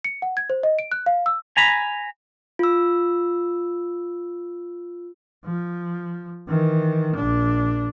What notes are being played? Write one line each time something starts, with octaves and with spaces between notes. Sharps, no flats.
C#7
F#5
G#6
C5
D#5
D7
F#6
F5
E6
G#5 A#5 B5
F4 E6
F3
D#3 E3
A#1 D4